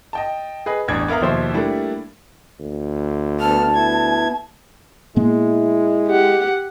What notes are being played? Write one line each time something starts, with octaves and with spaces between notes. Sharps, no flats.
D#5 G5 A5
G#4 B4 D#5
A1 E2 G2 D4 G#6
B3 A#4 E5 F5 A#5
D#2 B2 F3 C5 E5 C6
G3 A3 A#3 D4 E4
D2
B3 A5 F6
B3 E4 G#6
A#2 G#3 A#3 B3 E4
G4 F#5